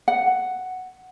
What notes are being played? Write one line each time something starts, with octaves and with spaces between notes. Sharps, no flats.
F#5